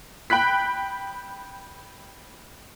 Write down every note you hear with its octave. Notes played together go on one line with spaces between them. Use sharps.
G5 B5 F#6 B6